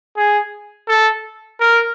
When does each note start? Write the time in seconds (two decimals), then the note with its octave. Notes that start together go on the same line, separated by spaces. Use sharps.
0.17 G#4
0.88 A4
1.60 A#4